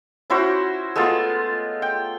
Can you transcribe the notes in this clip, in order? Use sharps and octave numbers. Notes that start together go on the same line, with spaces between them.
C#4 E4 F#4 C5
G#3 A3 B3 F4
G5